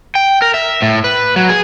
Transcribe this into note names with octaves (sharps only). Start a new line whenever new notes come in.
G5
A#4
E5
A2
B4
F#3
G#4